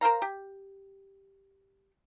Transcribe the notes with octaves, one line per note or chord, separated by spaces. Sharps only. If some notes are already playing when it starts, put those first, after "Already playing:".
A#4 C5 F5 A#5
G4